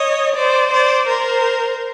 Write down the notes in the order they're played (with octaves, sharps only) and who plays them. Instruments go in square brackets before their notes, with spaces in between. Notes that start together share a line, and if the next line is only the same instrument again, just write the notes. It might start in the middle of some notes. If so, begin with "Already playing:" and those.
Already playing: [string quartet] C#5 D#5
C5 D5
C5 D5
A#4 C5